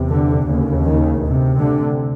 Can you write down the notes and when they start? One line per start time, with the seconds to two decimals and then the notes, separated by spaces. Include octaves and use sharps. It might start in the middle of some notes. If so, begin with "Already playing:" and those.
Already playing: E2 C3
0.09 D3
0.46 D#2 C#3
0.83 D#3
1.20 D2 C3
1.58 D3